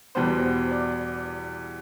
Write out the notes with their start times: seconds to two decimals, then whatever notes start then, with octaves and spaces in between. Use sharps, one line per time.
0.15 E2 B2 G3 B3 C5
0.44 C5
0.71 D5